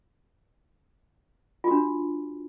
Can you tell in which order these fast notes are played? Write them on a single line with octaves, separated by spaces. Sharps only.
F4 F#4 D4